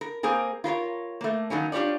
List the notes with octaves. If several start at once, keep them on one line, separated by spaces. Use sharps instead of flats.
A#4
A#3 C4 G#4 A#4
F4 A#4 C5 C#5
A3 A#3
D#3 F#3 A#3 C#4
D4 F4 G4 C#5 D5